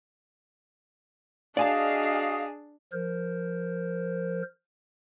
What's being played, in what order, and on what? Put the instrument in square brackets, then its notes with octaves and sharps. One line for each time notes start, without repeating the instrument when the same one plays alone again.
[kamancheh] D4 G#4 [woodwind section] F#4 D#5 [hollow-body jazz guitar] D5 G#5 A5 [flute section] F5
[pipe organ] F3 A#4 C5